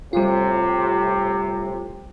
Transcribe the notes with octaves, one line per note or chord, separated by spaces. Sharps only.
A2 C3 G3 F4